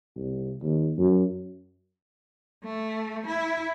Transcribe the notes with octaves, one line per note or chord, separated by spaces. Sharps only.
C2
D#2
F#2
A3
E4